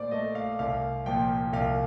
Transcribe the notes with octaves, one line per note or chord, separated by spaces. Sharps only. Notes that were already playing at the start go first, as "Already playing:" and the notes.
Already playing: A#2 A3 C5 D5
A3 D#5
F5
C2 F5
A#2 F3 G5
C2 F5